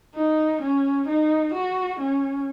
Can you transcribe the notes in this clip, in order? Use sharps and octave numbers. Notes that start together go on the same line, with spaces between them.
D#4
C#4
D#4
F#4
C#4